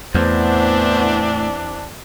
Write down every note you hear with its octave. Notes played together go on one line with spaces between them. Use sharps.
E2 A2 E3 B3 C4 D4 C5